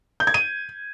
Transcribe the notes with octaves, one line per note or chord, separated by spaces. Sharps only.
G6
G#6
D#7